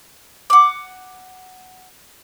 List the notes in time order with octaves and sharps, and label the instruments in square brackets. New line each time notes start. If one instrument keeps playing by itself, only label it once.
[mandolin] F#5 D6